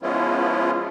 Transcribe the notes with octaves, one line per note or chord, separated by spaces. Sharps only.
F3 G#3 B3 C#4 E4 F4